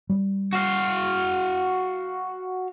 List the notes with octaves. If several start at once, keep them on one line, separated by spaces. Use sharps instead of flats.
G3
F#4 F5